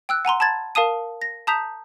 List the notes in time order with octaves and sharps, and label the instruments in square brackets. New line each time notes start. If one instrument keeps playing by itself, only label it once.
[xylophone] G5 E6 F#6
F#5 G#5 A#5 C6
A5 B5 G#6 A6
A#4 F5 A5 D#6 D#7
A#6
A5 A#5 D#6 G6 B6 F7